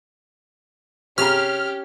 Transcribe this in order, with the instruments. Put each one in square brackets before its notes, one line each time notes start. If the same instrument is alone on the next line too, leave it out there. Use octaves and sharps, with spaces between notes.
[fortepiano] C3 G#4 A#5 [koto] C#4 [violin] G4 [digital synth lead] F6